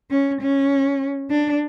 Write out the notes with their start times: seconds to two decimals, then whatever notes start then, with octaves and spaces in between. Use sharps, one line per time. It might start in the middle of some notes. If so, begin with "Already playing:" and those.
0.10 C#4
0.41 C#4
1.31 D4